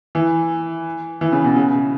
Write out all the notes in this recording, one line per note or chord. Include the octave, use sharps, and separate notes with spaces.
E3
E3
C#3
B2
C#3